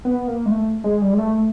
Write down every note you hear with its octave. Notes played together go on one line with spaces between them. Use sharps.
B3
A#3
G#3
A3
G#3
G3
G#3
A3